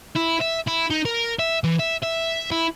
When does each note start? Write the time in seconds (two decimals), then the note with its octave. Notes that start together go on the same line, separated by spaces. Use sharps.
0.16 E4
0.40 E5
0.67 E4
0.90 D#4
1.05 A#4
1.39 E5
1.64 E3
1.79 E5
2.03 E5
2.52 E4